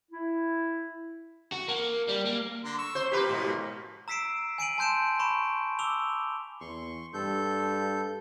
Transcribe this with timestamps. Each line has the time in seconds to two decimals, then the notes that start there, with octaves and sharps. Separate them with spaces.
0.11 E4
1.52 F#4
1.68 A#3
2.09 G3
2.26 A#3
2.64 D3 A#5 C6
2.78 C#6 E6
2.95 C5
3.12 F3 A#3 G4 A#4 B4
3.29 G#2 B2
4.08 A#5 E6 B6 C7 D7 E7
4.58 G#5 D7 D#7 F#7
4.78 A5 C6 G6 D7 E7
5.19 B5 C#6 D7 E7
5.79 D6 E6 F7 G7
6.60 E2 C6 C#6
7.14 G2 A4 G6